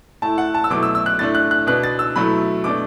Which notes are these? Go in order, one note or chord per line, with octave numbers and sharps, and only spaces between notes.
A2 A3 E4 A5
F#5
A5
E6
B2 F#3 A3 E4 D6
E6
E6
F#6
A2 A3 D4 A6
F#6
F#6
B2 B3 D4 F#6
A6
E6
B2 F#3 A3 E4 B5
B2 A3 D4 D6